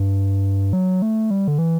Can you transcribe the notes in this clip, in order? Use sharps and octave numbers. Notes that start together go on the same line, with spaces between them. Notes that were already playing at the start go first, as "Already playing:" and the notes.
Already playing: G2
F#3
A3
G3
D3
E3